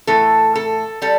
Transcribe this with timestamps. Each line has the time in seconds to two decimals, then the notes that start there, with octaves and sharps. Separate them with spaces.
0.07 A2 E3 A3 A4
0.56 A4
1.02 G3 A4